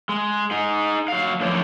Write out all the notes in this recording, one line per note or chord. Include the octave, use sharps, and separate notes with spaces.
G#3
D#4 G#4
F#3 F5
F#2 A2 F3 D4 C5 C#5